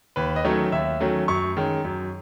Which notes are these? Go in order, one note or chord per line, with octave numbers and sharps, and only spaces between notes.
D#2 B4
D#5
D#3 F#3 A3 C#4 C#5
D#2 E5
D#3 F#3 A3 C#4
F#2 C#6
D#3 G#3 C#4
F#2